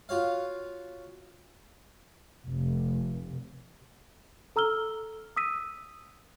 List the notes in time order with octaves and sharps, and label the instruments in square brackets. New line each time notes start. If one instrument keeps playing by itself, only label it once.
[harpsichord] F4 F#4 C#5 F5
[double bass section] F1
[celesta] A4 A#5 E6 F6 G7
D#6 E6 B6 D#7